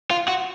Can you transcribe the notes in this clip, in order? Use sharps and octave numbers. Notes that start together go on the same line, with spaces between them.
F4
F#4